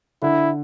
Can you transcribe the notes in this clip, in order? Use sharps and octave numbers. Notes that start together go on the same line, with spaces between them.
D3 E4